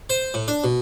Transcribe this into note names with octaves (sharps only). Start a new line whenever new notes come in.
C5
A2
D4
B2